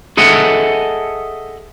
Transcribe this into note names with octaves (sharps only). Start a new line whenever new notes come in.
G#4 A4 D#5 E5 F#5